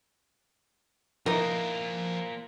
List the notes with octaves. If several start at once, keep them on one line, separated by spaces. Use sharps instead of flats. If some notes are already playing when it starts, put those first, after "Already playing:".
E3 F3 A#3 D#4 F4 A#4 E5